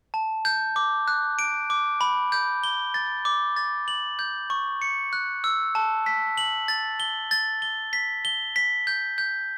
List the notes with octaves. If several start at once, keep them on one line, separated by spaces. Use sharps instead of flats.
A5
G6
D6
F#6
D7
D6
B5
G6
G7
A6
D6
A6
F#7
G6
C#6
C#7
F#6
E6
A5
B6
F#7
A6
G7
A6
G7
B6
G7
B6
G6
G6